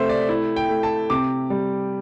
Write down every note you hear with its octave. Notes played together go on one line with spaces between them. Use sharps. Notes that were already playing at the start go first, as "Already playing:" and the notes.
Already playing: C3 A3 C5 E5
D5
E4
G5
A3
A5
C3 D6
G3